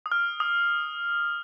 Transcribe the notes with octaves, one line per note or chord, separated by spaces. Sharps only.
D#6
F6
D#6